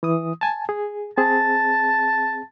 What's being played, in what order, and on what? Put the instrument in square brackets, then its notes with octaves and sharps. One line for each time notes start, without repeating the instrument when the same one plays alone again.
[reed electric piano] E3 D#6
G#5 A5
G#4
[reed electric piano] C4 G#4 [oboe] A5